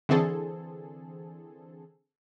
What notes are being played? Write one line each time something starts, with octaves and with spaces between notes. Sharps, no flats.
D3 E3 C4 G#4 A4